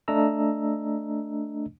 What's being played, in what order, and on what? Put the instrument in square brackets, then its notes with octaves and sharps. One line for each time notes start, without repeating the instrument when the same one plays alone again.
[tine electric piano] A3 D4 D#5 A#5 E6